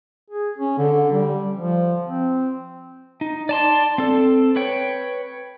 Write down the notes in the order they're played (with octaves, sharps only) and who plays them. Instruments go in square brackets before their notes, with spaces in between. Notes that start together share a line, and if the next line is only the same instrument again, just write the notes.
[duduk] G#4
C#4
D3
G3
F3
C4
[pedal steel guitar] D#4
D5 A5 C6
C4 A4
B4 C#5 G5